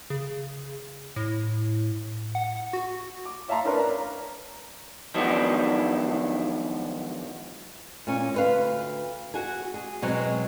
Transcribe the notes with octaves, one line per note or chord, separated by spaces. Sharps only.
C#3
A2
F#5
F#4
D6
C#5 E5 F5 A5 A#5 C6
C#4 D4 A#4 B4
A#5
D#3 F3 F#3 G#3 B3 D4
A#2 C#4
D2 B4 F5
F#4 G#4 G#5
G#4
B2 F#3 G#3 C4